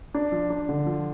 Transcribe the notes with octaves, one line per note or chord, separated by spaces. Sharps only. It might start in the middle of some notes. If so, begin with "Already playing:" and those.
D4
F3
D4
D3
F3